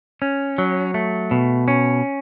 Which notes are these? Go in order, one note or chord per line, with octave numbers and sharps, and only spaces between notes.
C#4
F#3
A3
B2
C#4